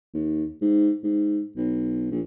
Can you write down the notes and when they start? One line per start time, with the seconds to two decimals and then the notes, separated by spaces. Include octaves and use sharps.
0.14 D#2
0.61 G#2
1.03 G#2
1.56 B1
2.11 A#1